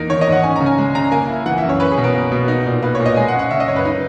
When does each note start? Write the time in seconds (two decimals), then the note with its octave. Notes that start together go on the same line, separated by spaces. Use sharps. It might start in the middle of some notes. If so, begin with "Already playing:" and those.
Already playing: E2 A#3 D#4 A#4
0.09 D#3 C#5
0.21 D#5
0.27 G#2
0.32 F#5
0.43 C#4 G#5
0.56 C#3 A#5
0.66 G#5
0.78 G#3
0.95 C#3 A#5
1.12 A#3 G#5
1.29 E4
1.46 E3 F#5
1.58 E5
1.63 F#2
1.69 C#5
1.80 C#4 B4
1.91 G#4
1.98 B2
2.04 A#4
2.14 A#3
2.32 B2
2.48 D#4
2.66 A#2
2.82 A#3 B4
2.95 A#2 C#5
3.06 D#5
3.17 G#3 G#5
3.28 F#5
3.34 C#4
3.39 F#5
3.51 C#3 E5
3.60 D#5
3.68 F#2 C#5
3.76 B4
3.85 D#4